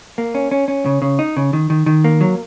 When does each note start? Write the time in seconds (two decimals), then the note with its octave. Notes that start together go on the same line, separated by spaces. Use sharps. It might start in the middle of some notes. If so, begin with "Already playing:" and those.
0.18 A#3
0.35 C#4
0.51 C#4
0.68 C#4
0.86 C#3
1.02 C#3
1.19 D#4
1.37 C#3
1.53 D#3
1.70 D#3
1.86 D#3
2.04 A#3
2.21 F#3